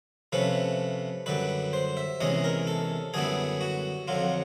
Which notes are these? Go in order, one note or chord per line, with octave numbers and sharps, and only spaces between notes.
C3 F3 A3 C#4 B4
F#2 D3 G3 B4
C5
E5
E2 C3 E3 G#3 C#4 D#5
A#4
A4
F#2 D3 G3 B3 E4 G#4
F#4
F2 D3 F#3 F4